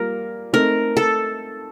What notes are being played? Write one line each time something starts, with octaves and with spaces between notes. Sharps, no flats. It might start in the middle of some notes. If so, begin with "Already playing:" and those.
Already playing: G3 A#3 F4 A#4
A3 C4 D#4 A4 A#4
A4